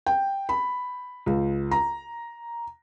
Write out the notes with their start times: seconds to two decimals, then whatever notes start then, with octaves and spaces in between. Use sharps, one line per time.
0.06 G5
0.49 B5
1.26 C#2
1.71 A#5